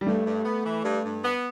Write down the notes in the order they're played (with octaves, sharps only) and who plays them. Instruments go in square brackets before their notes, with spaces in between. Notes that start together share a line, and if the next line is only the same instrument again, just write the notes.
[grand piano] G3
[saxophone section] G2 [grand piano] A3
[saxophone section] G2
B3
E3
G2
G2
B3